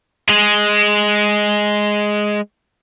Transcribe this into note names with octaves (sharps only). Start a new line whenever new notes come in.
G#3 G#4